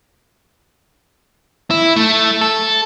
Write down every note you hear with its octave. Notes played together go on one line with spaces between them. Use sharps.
E4
A3
A4